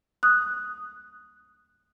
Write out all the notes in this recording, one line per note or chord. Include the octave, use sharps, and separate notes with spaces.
D#6 F#6